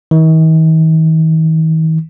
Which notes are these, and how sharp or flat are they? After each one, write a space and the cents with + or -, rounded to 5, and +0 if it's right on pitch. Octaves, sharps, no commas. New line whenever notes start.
D#3 +45